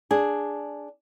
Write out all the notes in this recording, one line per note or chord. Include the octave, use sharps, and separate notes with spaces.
D4 G#4